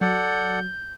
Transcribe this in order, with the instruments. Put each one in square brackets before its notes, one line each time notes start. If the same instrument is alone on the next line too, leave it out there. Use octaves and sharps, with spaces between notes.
[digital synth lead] F#3 [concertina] A4 D5 F#5 [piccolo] G6